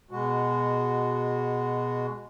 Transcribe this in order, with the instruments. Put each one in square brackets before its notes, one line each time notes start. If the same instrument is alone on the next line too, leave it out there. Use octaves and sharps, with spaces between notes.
[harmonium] B2 G#3 F#4